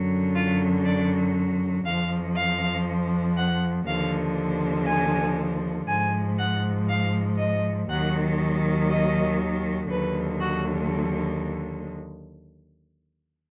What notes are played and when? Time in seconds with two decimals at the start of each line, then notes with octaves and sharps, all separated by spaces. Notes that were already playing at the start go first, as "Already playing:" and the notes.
Already playing: F#2 D3 F#3
0.35 F4
0.85 D5
1.85 F2 F3 F5
2.36 F5
3.36 F#5
3.87 D#2 D3 F3 F5
4.87 G#5
5.88 G#2 F3 G#5
6.38 F#5
6.88 F5
7.38 D#5
7.89 D#2 D#3 F#3 F#5
8.89 D#5
9.90 D#2 D3 F#3 B4
10.40 F#4